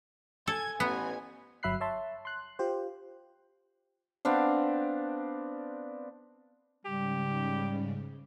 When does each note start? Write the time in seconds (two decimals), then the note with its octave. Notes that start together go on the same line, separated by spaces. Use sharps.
0.47 A4 G#5 G#6
0.80 A1 B3 G#5
1.63 G1 F#3 E5 B5 F#6 C7
1.81 C#5 E5 A5 C6
2.25 C6 F#6
2.59 F4 G4 C5
4.25 B3 C4 D4 F5
6.86 G#2 C#3 G3 G4